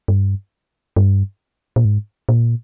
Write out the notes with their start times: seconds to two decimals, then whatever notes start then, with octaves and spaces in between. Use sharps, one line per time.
0.08 G2
0.96 G2
1.76 A#2
1.85 G#2
2.29 A#2